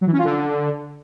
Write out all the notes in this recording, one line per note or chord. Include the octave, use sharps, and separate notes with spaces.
F#3
E3
C#4
F4
D3